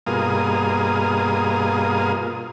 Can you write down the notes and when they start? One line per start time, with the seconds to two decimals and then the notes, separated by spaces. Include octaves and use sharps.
0.07 G2 B2 A#3 F4 G#4 D#6